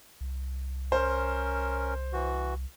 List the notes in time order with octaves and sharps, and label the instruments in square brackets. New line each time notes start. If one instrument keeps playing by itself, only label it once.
[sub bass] C2
[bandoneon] C#4 A#4 [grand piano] C5
[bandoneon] E3 F#4